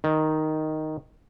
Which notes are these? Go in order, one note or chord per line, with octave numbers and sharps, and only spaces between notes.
D#3